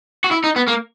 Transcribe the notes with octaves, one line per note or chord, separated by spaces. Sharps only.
F#4
E4
D#4
B3
A#3